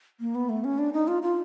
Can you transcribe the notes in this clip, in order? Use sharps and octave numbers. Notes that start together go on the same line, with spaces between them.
A#3
B3
A3
C#4
D4
D#4
F4
F4